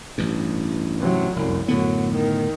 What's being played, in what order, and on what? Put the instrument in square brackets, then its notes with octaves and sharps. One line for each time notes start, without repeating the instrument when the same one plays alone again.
[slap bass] A1 G2
[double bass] C3 F#3
[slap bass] F1 [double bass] C2 F#2
[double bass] F#2 F#3 [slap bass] A2 D3 B3
[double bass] D#3